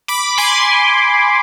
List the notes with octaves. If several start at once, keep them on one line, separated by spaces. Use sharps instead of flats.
B5 D6
G#5 C6